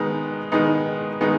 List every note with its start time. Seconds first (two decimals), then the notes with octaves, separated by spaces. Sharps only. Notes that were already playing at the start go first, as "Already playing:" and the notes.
Already playing: D#3 G#3 B3 D#4
0.52 D#3 G#3 B3 D#4
1.21 D#3 G#3 B3 D#4